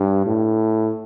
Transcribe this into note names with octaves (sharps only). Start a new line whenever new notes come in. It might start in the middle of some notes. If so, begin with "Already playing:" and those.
Already playing: G2
A2